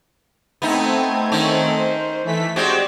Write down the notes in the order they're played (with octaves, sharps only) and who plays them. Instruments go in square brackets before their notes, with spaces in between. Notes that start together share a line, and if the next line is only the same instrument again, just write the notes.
[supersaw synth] A3 C4 G#6 [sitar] B3 D#4
[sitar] D#3 C#4 D#4
[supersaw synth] C5
E3 A3 B6
[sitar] G#3 C4 F#4 [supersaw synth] G4 D5